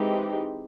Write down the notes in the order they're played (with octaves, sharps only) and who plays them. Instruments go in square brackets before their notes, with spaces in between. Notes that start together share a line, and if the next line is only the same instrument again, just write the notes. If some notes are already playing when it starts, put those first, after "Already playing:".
Already playing: [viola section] E3 G#3 C4 D#4 G4